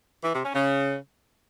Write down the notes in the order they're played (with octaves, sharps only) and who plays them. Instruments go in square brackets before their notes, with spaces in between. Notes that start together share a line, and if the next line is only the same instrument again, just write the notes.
[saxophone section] E3
C3
C#4
C#3